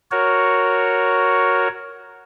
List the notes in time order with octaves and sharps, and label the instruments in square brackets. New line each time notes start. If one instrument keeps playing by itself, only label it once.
[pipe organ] F#4 A#4 C#5